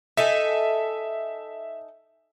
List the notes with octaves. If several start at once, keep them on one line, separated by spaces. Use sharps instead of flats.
D#4 A4 E5 G#5